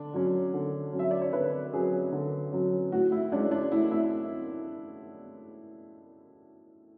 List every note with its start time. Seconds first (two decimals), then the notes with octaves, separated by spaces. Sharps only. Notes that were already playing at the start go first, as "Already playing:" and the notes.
Already playing: D3 D4
0.14 F#3 C#4
0.54 D3
0.93 F#3 C#4
0.99 E5
1.11 D5
1.22 C#5
1.33 D3 B4
1.73 F#3 C#4 G#4
2.12 D3
2.52 F#3 C#4
2.92 A2 F#4
3.12 E4
3.32 G#3 C#4 D4
3.51 D4
3.72 A2 E4
3.91 E4